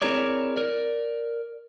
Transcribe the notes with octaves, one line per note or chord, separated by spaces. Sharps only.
C4 E4 G#4 A#4 C#5 D5
A#4 D5